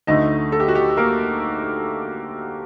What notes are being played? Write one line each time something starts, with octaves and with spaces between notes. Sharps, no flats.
D2 D3 A3 D#4 D#5
A4
G4
F#4
G4
A#3 A#4